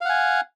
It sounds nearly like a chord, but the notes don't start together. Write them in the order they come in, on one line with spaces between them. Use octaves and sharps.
F5 F#5 G#5